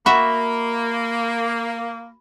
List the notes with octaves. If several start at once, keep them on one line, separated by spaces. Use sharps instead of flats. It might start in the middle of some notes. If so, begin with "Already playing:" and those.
A#3 F#4 E5 B5